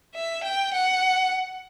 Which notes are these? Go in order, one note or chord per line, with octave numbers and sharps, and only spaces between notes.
E5
G5
F#5